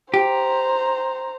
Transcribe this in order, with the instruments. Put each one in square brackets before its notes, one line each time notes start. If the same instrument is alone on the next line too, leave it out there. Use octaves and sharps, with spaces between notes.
[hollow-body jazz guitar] G4 [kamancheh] C5 A#5